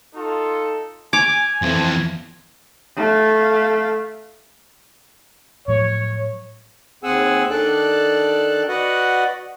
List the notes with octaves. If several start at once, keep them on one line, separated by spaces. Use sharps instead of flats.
D#4 F4 A4
G#5 D6 G#6 F7
F2 E3 F3 A3
A3 F5
A2 F3 F#3 C#5
D#2 C4 G#4 F#5 G#5 E6
D#3 D4 A4 D5 F#6
F#4 B4 D5 D#5 F#5